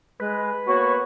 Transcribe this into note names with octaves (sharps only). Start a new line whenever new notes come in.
G#3 B4
A#3 B3 F#4 C#5 C#6